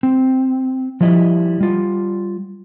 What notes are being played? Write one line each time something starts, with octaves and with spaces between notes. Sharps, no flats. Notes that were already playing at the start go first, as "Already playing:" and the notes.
C4
F3 G3 E4 D#5
G3 F4